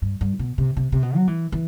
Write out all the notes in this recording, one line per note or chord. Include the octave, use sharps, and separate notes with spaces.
G2
G2
B2
C3
C3
C3
B2
F#3
E3
E3